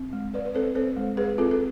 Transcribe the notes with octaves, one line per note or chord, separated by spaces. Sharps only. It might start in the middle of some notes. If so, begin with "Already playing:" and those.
Already playing: C4
G#3
G#3 B4 D5
B4
C4 A4 C5
C4 A4 C5
G#3
G#3 G#4 B4
C4 F4 A4
A4